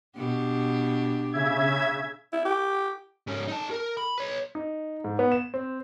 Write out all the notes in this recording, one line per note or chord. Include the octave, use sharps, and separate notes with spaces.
B2 D4 G4
C#3 E5 G#6
E4
G4
G#2 C#4
D#4 A5
A#4
B5
B4 C#5
D#4
G#2
B3
E7
C4